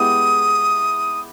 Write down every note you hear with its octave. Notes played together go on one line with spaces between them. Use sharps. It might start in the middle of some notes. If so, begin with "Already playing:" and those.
Already playing: G#3 B3 E4 G4 D#6